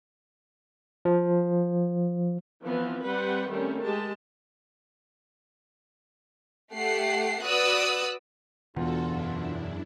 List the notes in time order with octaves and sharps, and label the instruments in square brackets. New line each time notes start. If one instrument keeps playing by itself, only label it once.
[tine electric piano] F3
[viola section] E3 F3 B3 C4
G3 C4 B4 F#5 C6
D#3 G3 A3 C4 C#4
G#3 G4 A5
[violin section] A3 G4 F#5 C7
F#4 B4 D5 D#6 E6 F#6
[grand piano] E2 [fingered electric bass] B2 E3 B3 [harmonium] D3 F4 [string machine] F#4 A4
[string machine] F#2 D4 E4